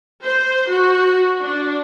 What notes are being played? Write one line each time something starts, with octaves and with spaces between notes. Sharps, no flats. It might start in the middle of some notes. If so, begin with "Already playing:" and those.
C5
F#4
D4